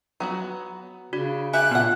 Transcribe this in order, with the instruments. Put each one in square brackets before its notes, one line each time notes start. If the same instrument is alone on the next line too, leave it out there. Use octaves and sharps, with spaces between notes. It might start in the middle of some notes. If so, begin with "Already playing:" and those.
[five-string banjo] F#3 B3 F#4 [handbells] A#5
[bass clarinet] C#3 [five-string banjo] D4 [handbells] F#4
[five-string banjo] G4 E5 [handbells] G#5 [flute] F#6
[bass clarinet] A#2 [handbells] B3 [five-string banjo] A4 F#5